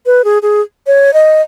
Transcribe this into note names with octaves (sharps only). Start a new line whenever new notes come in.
B4
G#4
G#4
C#5
D#5